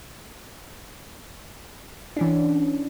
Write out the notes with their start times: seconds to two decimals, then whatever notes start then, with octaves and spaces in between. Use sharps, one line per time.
2.17 E3 C#4 D4